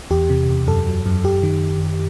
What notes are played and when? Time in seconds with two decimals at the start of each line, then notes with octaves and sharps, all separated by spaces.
0.11 E2 G4
0.30 C3
0.49 E2
0.67 F#2 A4
0.86 F#3
1.06 F#2
1.24 F#2 G4
1.43 D#3